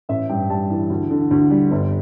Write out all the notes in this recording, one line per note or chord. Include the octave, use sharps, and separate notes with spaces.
A1 E5
G2 G5
G3 A5
E3
D2
D3
D2
G3
G1